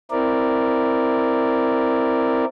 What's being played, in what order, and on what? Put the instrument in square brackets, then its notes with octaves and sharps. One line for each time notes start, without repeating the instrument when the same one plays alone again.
[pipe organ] C4 E4 A#4 D5